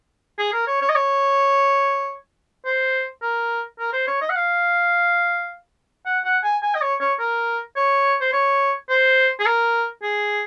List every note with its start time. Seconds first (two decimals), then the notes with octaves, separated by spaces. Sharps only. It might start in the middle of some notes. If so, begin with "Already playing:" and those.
0.39 G#4
0.53 A#4
0.67 C#5
0.81 C#5
0.89 D#5
0.95 C#5
2.65 C5
3.22 A#4
3.79 A#4
3.93 C5
4.07 C#5
4.22 D#5
4.30 F#5
4.36 F5
6.06 F#5
6.25 F#5
6.44 G#5
6.63 G#5
6.75 D#5
6.82 C#5
7.00 C#5
7.19 A#4
7.76 C#5
8.21 C5
8.33 C#5
8.89 C5
9.40 G#4
9.46 A#4
10.03 G#4